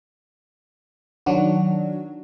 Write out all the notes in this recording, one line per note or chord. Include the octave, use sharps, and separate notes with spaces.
D#3 F#3 D4 F#4